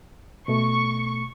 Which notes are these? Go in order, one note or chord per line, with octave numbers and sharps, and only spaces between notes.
B2 A3 C#6